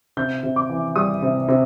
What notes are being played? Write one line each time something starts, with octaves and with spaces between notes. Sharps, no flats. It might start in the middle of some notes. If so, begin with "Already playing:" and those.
C3 G6
C3
D6
E3
G3 D#6
C3
C3